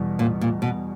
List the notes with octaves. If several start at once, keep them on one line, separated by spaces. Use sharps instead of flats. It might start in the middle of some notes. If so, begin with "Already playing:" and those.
Already playing: E2 B2 G3
A#2
A#2
B2